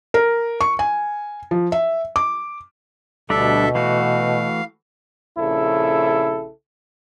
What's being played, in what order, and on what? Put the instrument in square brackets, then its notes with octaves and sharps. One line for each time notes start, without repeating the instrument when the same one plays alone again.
[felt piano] A#4
C#6
G#5
F3
E5
D6
[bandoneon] D2 A4 E5 [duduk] B2 [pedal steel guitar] G3 D4 D5
[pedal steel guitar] E3 A3 F#4 [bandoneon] F5
[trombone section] A#1 C#3 E4 A4